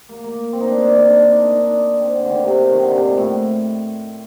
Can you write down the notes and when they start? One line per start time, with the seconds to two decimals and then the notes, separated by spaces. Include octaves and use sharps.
0.09 A#3
0.24 A#3
0.53 C4
0.60 D#4
0.68 D4
0.82 D4
0.96 D#4
1.10 D4
1.24 D#4
1.38 D4
1.52 D#4
1.66 D4
2.00 C4
2.15 D3
2.25 D3 D#3
2.44 C3
2.72 D#3
2.83 D3
2.94 C3
3.06 A#2
3.18 A2